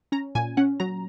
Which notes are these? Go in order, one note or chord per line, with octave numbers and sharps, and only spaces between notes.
C#4 A#5
A#2 G#5
C#4 F#5
F#3 A#5